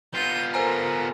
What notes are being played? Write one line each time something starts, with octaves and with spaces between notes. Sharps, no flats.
B3 F4 G6 D#7
A4 A#4 C5 G#5 A#5